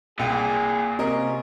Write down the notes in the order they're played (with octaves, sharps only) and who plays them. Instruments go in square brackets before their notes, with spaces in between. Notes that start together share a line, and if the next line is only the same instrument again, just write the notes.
[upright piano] C2 G5 [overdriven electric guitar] A#2 [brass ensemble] G#4
[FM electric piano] C3 [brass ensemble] C#4 F4 [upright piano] A#4 D#5